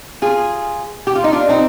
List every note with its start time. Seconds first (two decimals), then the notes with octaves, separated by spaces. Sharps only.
0.22 F4 G#4
1.07 G4
1.16 F4
1.24 D#4
1.33 D4 F4
1.49 C4 D#4